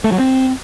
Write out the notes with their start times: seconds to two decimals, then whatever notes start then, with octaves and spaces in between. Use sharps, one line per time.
0.04 A3
0.12 F#3
0.19 C4